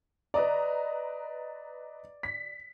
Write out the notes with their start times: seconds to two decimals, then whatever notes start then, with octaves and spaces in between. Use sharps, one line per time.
0.34 B4 D5 D#5 A#5
2.23 B6